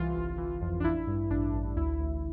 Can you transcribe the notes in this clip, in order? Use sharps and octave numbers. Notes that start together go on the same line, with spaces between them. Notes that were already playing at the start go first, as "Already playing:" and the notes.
Already playing: C2 E3 F4
G1
E3
F2
D4
A1 E4
G2
A1 D4
A1
D2 E4
D2